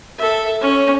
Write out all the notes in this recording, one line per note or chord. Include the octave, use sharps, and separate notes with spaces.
A4 E5
C#4